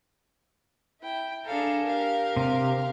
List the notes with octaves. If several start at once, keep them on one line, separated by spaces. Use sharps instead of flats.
E4 G5
D4 G#4 A4 F5 A#5
G4 A#4 F5
C3